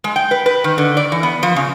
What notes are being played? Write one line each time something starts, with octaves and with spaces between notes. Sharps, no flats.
G#3
G5
B4
B4
D#3
D3
D5
E3
B3
F3
C#3